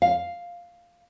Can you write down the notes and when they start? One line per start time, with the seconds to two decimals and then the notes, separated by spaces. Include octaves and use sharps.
0.02 F5